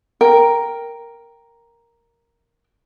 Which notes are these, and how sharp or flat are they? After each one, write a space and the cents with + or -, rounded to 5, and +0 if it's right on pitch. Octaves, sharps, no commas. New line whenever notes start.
A#4 +0 G5 +0